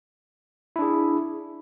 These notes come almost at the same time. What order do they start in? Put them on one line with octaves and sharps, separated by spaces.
E4 D4 G#4